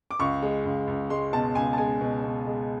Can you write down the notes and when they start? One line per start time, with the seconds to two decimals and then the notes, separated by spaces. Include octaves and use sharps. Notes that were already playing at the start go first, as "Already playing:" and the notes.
0.11 D6
0.19 C#2 C#6
0.42 G#3
0.65 C#2
0.87 C#2
1.10 G#3 C6
1.33 B2 A5
1.55 C#2 G#5
1.73 A5
1.78 G#3 G#5
2.01 B2
2.24 B2
2.47 G#3